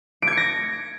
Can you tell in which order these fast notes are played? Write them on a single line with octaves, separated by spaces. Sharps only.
D7 G#6 C#7 A#6